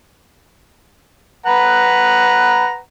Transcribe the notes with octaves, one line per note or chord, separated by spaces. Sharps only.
B4 F#5 A#5